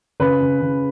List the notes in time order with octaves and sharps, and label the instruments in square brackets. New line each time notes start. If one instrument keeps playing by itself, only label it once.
[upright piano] C#3 B4
C#3
C#3